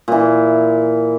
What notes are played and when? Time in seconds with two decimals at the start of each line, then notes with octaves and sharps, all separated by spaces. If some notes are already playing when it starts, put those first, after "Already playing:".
0.08 A#2 E3